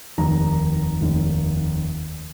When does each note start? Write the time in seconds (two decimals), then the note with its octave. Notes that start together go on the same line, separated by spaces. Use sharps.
0.18 F1 D#2 D#3 A#5
1.01 F1 D#2 D#3